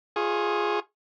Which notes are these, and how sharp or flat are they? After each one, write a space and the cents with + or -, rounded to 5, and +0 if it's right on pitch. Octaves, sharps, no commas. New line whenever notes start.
F4 +0 G#4 +0 C#6 -30